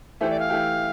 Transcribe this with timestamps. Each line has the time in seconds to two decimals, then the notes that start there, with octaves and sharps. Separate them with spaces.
0.21 E3 A3 E4 G4 C5
0.30 D5
0.40 F5
0.50 E3 A3 E4 G4